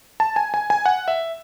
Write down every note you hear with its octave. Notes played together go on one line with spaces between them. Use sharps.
A5
G#5
G#5
G#5
F#5
E5